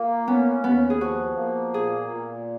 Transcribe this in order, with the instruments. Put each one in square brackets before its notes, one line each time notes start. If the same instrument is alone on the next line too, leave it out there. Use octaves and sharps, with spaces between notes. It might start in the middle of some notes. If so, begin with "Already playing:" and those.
Already playing: [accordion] A#3 [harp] F4
[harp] B3 [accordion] C#4
[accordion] D#2 [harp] B3
[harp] G#4
[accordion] F3 [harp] F#4
[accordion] A#3
[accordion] A#2 [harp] G#4
[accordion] A#2